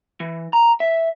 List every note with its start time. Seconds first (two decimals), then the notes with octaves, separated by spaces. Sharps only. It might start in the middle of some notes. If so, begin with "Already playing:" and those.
0.20 E3
0.53 A#5
0.80 E5